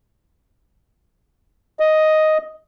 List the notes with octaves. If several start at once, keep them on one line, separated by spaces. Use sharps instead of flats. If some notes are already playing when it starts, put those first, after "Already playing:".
D#5